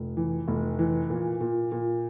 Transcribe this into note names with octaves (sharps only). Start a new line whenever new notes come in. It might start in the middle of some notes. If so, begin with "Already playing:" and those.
Already playing: F1
E3
F1
E3
A#2
A#2
A#2